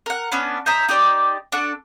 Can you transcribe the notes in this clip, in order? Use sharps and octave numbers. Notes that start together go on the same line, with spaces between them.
A#4 F#5
B3 C#4 D4 B4
C5 D#5 E5 A#5
D#4 G4 C5 D5
D4 F#4 A4 F#5